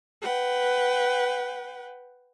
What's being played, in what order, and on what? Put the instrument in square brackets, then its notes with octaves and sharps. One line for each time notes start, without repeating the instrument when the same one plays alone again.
[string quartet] B4 F#5 G5